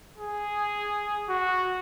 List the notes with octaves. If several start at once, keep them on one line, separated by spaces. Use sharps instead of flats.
G#4
F#4